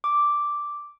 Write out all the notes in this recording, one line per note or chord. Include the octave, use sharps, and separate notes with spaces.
D6